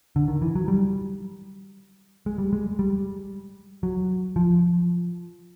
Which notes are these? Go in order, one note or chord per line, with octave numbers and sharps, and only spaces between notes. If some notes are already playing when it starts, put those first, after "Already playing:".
D3
D#3
E3
F#3
G3
G#3
G3
G#3
G3
F#3
F3